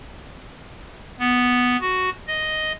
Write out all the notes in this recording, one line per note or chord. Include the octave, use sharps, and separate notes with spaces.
B3
F#4
D#5